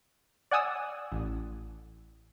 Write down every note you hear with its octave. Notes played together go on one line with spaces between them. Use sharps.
D5 F#5 G#5 D#6 E6
A1